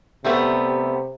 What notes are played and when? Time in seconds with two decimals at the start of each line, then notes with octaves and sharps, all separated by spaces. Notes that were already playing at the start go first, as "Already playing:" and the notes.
0.24 C3 G3 A3 B3